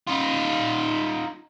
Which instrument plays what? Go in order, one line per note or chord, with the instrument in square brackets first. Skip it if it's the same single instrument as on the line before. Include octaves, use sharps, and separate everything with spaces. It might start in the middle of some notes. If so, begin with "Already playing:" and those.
[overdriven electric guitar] D#4 F4